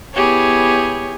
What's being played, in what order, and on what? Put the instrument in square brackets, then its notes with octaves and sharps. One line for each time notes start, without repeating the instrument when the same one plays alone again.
[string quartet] B3 E4 G4 G#4 C#5